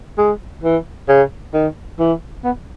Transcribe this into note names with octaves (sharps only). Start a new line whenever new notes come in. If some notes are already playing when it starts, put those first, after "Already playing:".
G#3
E3
C#3
D#3
E3
B3